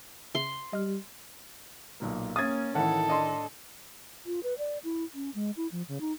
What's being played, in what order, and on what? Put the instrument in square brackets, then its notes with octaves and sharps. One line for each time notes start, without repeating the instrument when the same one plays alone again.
[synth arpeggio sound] C#3 E5 [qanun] C6
[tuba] G3 [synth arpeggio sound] D#5 F6
[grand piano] B1 A#2 A#3
[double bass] A#3 C#4 [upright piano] D#6 G#6 [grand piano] A6
[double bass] A2 [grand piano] D#3 E4 [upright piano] E3 F#5 [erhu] A4
[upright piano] D4 D#5 C6
[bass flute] F4
B4
D5
E4
C#4
G#3
E4
F3
C#3
D#4